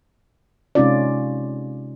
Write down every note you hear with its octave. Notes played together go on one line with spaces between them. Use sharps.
C3 G#3 C#4 D#4 F4 D5